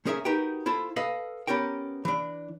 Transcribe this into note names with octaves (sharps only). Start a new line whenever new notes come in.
A3 C#4 G#4 A#4 D#5 E5
D#4 F#4 G4 A#4 B4 G5
E4 F4 A4 C5
A4 B4 D#5 F5
B3 C#4 G4 A#4 G5
E3 D4